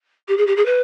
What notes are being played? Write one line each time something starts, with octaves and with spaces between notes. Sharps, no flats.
G4
G#4
G4
G#4
B4